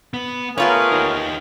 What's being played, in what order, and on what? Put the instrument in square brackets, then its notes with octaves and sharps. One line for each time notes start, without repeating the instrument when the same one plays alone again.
[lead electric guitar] B3
[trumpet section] A3 G#4 A#4 [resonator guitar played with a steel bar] B3 F4 C#5 [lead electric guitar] B4
[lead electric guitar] D#4 G4